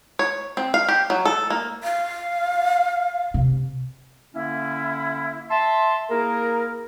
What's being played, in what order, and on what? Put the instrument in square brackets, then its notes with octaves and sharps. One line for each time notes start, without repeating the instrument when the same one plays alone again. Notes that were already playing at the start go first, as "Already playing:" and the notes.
[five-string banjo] C#5
C4
F5
G4
F#3
A4
A#3
[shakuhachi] F5
[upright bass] C3
[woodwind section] D3 A#3 C#4 E4
E5 A5 C6
A#3 E4 G#4 A#4